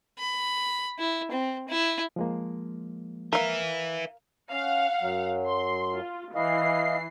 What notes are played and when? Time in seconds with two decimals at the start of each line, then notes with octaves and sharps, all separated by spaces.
0.19 B5
0.99 E4
1.31 C4
1.68 E4
2.16 F3 G#3 A#3
3.33 A#4 B4 E5 F5
4.52 C#4 F5 F#5
5.01 F#2 F#3
5.46 C6
5.94 F4
6.35 E3 E4 D#5 F5 C7